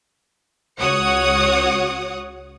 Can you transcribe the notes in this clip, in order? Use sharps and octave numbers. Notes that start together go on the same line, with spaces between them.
C#2 F#4 C#5 F#5 D#6 C#7